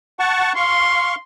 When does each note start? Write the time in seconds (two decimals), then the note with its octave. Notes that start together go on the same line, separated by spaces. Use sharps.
0.19 F#5 A5 C#6
0.56 F5 C6 C#6